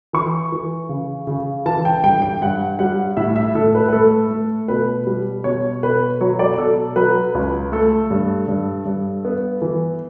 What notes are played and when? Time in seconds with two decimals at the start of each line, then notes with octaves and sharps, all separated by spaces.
0.13 E3 C#6
0.52 E3
0.89 C#3
1.27 C#3
1.66 E3 A5
1.85 G5
2.04 G2 G5
2.22 G5
2.41 G2 F#5
2.79 G3 F#5
3.17 A2 E5
3.36 E5
3.55 A2 A4
3.75 B4
3.89 B4
3.93 A3 A4
4.30 A3
4.68 B2 B4
5.07 G3
5.44 B2 C#5
5.83 B2 B4
6.21 F#3 C#5
6.39 D5
6.58 B2 A4
6.96 F#3 B4
7.35 C#2
7.72 A3 A4
8.10 G2
8.48 G2
8.86 G2
9.25 B3
9.62 E3